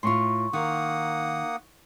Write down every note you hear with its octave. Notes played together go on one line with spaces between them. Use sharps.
A2 F4 C6 C#6
D#3 A#3 F#5 D#6